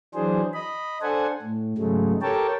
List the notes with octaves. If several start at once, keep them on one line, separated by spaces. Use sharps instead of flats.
E3 F#3 D4 G#4 C5
D#5 B5
D4 A4 C5 F#5 G#5
A2
G#2 C#3 F#3 G#3 A3
G4 A4 A#4 C#5 G5 A5